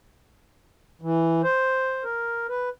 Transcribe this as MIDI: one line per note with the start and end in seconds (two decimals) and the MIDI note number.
1.02 1.42 52
1.44 2.04 72
2.04 2.47 70
2.49 2.69 71